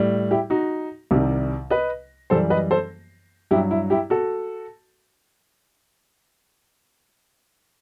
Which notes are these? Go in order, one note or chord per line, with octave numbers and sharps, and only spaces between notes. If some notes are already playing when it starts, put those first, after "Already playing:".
Already playing: A2 G3
E4 G4
D#4 F#4
C2 C3 D#3 G3
B4 D#5
F#2 E3 G3 A4 C5
B4 D#5
A4 C5
G2 F#3 E4 G4
E4
E4 G4
F#4 A4